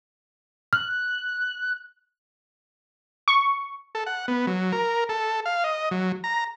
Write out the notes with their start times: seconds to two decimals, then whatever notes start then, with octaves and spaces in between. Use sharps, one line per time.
0.73 F6 F#6
3.28 C#6
3.95 A4
4.06 F#5
4.28 B3
4.47 F#3
4.72 A#4
5.09 A4
5.46 F5
5.64 D#5
5.91 F#3
6.24 A#5